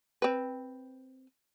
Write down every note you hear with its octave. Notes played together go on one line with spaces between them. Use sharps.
C4 B4